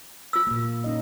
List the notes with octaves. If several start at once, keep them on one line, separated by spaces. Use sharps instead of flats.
F4 E6
A#2 A#3
C#4 D#4 D#5